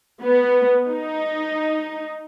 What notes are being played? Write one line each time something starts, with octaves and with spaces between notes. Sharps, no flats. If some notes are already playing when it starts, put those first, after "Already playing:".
B3
D#4